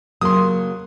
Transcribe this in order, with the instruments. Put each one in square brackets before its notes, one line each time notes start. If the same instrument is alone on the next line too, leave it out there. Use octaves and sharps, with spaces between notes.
[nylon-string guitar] C#3 F#3 A#3 [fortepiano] C6 D#6